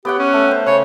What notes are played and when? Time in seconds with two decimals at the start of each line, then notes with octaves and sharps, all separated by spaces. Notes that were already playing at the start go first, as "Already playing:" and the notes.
0.05 B3 G4 C#5 F#5
0.19 C#4
0.33 A3
0.48 C5 G5
0.66 C#3 C#5